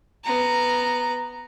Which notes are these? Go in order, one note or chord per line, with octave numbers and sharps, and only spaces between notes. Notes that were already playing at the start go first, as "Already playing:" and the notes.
B3 A#5